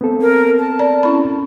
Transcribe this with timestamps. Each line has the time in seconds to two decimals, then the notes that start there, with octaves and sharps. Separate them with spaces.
0.01 B3 C4 A4
0.21 A#4
0.59 A5
0.79 D5 A#5
1.03 C#4 E4 B5